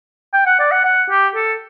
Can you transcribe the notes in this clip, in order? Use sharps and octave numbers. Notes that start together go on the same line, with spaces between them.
G5
F#5
D5
F#5
F#5
G4
A4